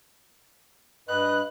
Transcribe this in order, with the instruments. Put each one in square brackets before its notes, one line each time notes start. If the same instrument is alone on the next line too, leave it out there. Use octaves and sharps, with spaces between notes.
[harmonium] G2 B4 D#5 [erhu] F#6